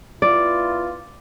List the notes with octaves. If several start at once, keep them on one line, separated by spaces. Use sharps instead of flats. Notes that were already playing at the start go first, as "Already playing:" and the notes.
B3 E4 F4 D5